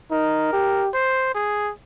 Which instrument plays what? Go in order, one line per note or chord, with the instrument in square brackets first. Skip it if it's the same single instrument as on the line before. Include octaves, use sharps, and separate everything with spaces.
[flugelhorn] D#4 [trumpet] A#4
[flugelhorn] G4
[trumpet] C5
G#4